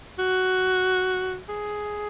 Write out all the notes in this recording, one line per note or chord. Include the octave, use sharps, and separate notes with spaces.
F#4
G#4